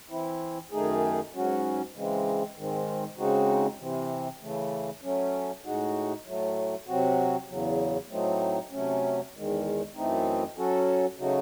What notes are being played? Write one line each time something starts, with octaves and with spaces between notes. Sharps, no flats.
E3 C4 E4
F#2 D#3 A3 D#4 G#4
G#2 F#3 C#4 F#4
C#3 E3 G#3 C4
G#2 D#3 G#3 C4
C#3 G#3 C4 D#4 F#4
C3 E3 C4
C#3 E3 A3
F#3 A3 C#4
A2 G#3 D#4 F#4
A2 F#3 A3
C3 F#3 C4 F#4
E2 C#3 F#3
A2 F#3 A3 C4 D#4
C3 F#3 A3 C#4
E2 D#3 G#3
F#2 E3 A3 C4 D#4
F#3 C#4 F#4 A4
C#3 F#3 A3 D#4 F#4